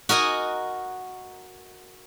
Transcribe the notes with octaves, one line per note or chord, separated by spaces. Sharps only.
F#4 A#4 D#5 G#5